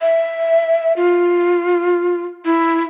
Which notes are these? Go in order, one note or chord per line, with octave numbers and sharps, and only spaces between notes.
E5
F4
E4